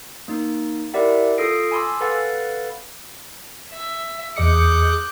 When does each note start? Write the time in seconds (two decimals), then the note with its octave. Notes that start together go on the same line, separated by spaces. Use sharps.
0.28 A#3 D#4
0.94 E4 G4 A#4 D5 E5 F#5
1.38 F4 A4 D#6 A#6 C7 D7
1.71 G#5 A5 B5 C6 D6 E6
2.01 A4 B4 F5 F#5 B5 A6
3.71 E5
4.37 E2 G#4 D#5 D6 D#6 F#6 G6 C#7